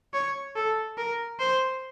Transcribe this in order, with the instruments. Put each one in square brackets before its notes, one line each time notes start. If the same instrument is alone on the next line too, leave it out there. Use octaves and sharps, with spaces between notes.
[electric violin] C#5
A4
A#4
C5